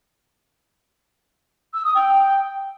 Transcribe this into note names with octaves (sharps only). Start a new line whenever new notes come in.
E6
D#6
G5